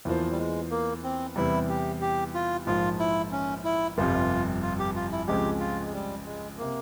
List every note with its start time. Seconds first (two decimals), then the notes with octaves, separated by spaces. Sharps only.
0.05 E2 E3 F3 A#3 F4 C5
0.31 G3
0.38 G#3
0.71 A#3
1.04 C4
1.36 E2 C3 E3 G3 E4
1.69 G4
2.01 G4
2.34 F4
2.67 A#1 G#2 F3 F4
2.99 E4
3.32 C#4
3.65 E4
3.97 G1 F2 C3 G3 F4
4.62 F4
4.79 G4
4.95 F4
5.11 E4
5.28 C#2 C#3 F3 G#3 C4 G4
5.60 F4
5.85 G#3
5.93 G3
6.26 G#3
6.58 C3 A#3